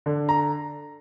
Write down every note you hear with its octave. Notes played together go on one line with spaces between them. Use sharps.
D3
A#5